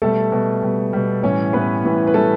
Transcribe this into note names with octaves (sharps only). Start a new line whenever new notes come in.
B2 G3 A3 A4
B2 G3
B2 G3
B2 G3
A2 E3 G3 C#4 C#5
A2 E3 G3 B3 B4
A2 E3 G3
B4
A2 E3 G3 A3 A4